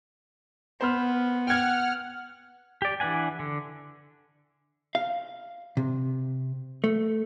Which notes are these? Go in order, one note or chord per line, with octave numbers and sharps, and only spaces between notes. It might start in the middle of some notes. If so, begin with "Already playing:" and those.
B3 C5 B5 F6
F#5 G5 F6 G#6
G4 D5
E3 D4 B4 F#5 G#5
D3
F5
C3
A3